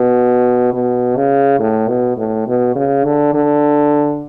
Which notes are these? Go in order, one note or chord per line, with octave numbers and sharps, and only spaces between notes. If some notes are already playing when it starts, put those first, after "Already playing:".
Already playing: B2
B2
C#3
A2
B2
A2
B2
C#3
D3
D3